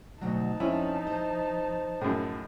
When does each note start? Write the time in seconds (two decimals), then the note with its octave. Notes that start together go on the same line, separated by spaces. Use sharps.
0.21 D2 B2 F3 F#3 D#4 A5
0.60 F2 C#4 E4 G#5
1.07 C5
2.01 F#2 A2 G#4